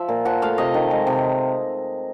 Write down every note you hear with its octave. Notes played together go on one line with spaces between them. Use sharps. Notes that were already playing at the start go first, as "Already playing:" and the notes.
Already playing: F3 E5
A#2
F3 F#5
A3 F5
C3 D#5
D#3
G#3
C3